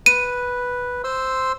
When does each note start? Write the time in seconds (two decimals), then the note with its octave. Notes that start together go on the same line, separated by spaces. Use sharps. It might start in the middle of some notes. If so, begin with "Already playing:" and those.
0.06 B4 D#7
1.04 C5 C6 E6